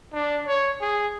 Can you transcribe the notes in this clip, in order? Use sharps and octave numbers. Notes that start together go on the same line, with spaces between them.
D4
C#5
G#4